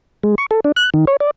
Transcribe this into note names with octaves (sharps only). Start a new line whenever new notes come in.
G#3
C#6
A4
D4
F#6
D#3
C#5
D5